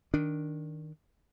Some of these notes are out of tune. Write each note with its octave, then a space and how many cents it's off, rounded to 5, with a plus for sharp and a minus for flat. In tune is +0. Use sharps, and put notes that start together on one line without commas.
D#3 +0 D4 +0